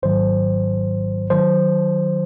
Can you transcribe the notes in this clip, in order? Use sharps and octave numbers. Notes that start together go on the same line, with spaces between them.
G#1 G#2 D#3 F#3 C5
D#3 F#3 C5